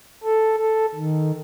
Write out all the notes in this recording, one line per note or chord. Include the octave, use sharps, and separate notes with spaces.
A4
A4
D#3